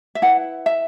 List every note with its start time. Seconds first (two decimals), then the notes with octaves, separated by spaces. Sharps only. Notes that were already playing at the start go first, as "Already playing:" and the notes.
0.15 E5
0.22 E4 B4 F#5
0.66 E5